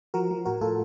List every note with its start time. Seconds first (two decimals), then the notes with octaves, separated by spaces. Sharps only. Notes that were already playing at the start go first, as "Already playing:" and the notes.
0.14 F3 F#4 A#4
0.31 F3
0.45 A2 F#4 A#4
0.61 A2 F4 A4